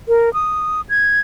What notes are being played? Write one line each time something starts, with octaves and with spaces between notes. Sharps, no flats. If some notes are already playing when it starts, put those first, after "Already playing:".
A#4
D#6
G#6